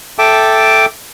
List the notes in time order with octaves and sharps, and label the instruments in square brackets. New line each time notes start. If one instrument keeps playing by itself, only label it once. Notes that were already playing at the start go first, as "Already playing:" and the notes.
[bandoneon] A4 E5 G5 A5 D6